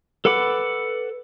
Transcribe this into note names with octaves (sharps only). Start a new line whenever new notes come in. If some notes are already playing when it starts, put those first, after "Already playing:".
A4 B4 F#5 B5 D6